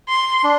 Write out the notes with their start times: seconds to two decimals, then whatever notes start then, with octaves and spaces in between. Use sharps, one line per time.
0.09 C6
0.44 D4